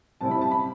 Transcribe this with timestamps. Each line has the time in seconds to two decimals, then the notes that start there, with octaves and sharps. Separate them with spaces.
0.21 C3 G3 C4 E4 A5
0.31 B5
0.41 A5
0.51 B5